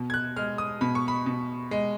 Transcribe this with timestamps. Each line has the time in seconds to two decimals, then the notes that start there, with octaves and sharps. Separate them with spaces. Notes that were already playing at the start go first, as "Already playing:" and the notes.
Already playing: B2
0.10 G#6
0.14 F#6
0.36 G#3 F6
0.58 D#6
0.81 B2 B5
0.95 C#6
1.08 B5
1.26 B2
1.71 G#3